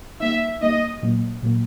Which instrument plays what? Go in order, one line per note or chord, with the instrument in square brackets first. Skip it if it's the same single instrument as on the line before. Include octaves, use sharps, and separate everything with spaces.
[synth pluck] G3 A#3 D#4 [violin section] E5
[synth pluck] G3 A#3 D#4 [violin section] D#5
[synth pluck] A#2 F#3 A#3
A#2 F#3 A#3